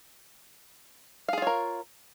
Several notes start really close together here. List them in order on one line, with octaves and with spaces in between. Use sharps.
F5 G#4 F4 C#5 A#4